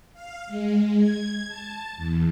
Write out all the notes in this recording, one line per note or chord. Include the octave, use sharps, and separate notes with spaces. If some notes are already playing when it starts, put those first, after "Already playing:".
F5
G#3
G#6
A5
E2